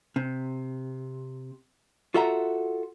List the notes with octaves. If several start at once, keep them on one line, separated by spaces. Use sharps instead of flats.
C3
F4 F#4 A4 E5 F#5 A#5